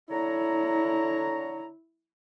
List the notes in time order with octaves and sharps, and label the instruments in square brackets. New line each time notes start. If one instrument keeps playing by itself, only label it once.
[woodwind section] D3 C#5 A#5 [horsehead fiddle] E4